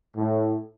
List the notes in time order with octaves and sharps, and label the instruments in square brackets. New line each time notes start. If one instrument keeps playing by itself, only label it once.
[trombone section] A2